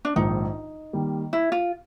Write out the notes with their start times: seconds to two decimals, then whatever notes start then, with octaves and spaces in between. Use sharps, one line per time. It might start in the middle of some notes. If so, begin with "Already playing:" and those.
0.05 D4
0.16 A#1 G#2 D#3 D#4
0.93 D#3 G3 A#3
1.33 E4
1.52 F4